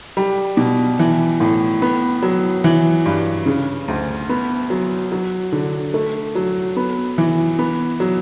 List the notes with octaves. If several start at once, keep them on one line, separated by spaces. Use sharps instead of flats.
G3
B2
E3
A2
B3
F#3
E3
G2
C#3
D2
B3
F#3
F#3
D3
A3
F#3
B3
E3
B3
F#3